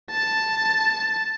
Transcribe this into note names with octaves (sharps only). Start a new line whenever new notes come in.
A5